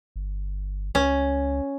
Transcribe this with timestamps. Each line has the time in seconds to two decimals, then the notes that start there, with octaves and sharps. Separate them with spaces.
0.16 G1
0.95 C#2 C#4